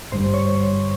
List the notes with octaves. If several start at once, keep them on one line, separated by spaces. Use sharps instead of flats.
G#1 G2 D3 G3 C5 C6
C#5 C#6